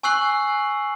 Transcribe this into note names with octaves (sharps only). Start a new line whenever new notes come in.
G#5 C#6 E6 F#6 C7 F#7